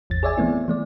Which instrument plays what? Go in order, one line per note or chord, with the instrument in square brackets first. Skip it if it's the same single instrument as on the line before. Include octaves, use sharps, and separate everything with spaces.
[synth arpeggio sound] G#1 E2 A6
G#4 C#5 D5 E5 G#5
E3 A3 B3 C4 E4
E3 A3 D5